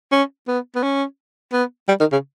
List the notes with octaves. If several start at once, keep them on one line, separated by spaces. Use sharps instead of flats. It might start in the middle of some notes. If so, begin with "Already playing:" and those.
C#4
B3
B3
C#4
B3
G3
D#3
C#3